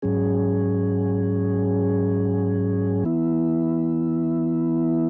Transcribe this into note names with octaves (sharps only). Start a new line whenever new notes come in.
G#2 F#3 C#4 G#4
E3 B3 E4